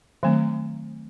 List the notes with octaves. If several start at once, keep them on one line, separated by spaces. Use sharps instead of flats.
D#3 F#3 A3 C4